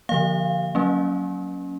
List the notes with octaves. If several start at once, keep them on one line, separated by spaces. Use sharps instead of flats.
D3 F3 A#3 F5
F#3 A#3 C#4